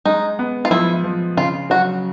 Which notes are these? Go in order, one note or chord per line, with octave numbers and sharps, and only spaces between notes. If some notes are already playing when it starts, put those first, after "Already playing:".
G#3 D#4
B3
F4
F3 E4
F3
C#3 F4
F#3 F#4